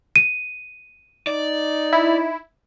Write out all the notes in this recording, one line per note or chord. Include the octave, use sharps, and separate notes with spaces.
D#7
D#4 D5
E4